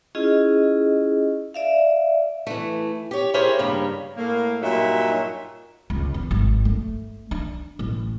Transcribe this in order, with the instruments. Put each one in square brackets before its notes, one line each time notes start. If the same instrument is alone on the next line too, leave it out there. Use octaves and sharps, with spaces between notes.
[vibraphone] C#4 E4 F4 G#4 D#5
D5 E5 F5
[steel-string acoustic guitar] E3 A3
G4 C#5
E4 G4 G#4 A#4 C5 C#5
G2 C#3 G3 A#3
[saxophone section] A2 A#3
G2 A#2 F#3 D#4 E5
[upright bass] C#2
E2
G#1
A3
D4
A1